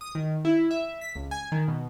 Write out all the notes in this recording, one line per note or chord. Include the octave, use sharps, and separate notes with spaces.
D#6
D#3
E4
E5
B6
C#2
G#5
D#3
B2